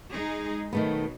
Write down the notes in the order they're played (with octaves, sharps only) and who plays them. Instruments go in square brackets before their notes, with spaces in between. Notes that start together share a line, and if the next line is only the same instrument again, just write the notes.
[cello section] G#3 D#4 G#4
[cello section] B2 F#3 [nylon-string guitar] D#3 A3 B3